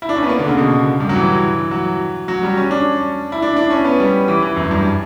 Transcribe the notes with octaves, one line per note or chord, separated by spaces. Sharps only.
E4
D4
C#4
B3
A#3
D3
C#3
B2
G2
F#3
E3
F#3
F#3
G3
C#4
D4
E4
D4
D4
C#4
B3
G3
E3
E3
F#2
G2